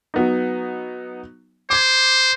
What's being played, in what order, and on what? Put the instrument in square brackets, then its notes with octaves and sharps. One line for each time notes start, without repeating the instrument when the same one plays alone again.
[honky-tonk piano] F#3 B3 D#4
[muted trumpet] C5 [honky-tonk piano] D6 G#6